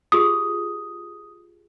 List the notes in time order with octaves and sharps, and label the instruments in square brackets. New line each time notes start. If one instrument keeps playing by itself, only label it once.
[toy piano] F4 G4 G#4 [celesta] D#6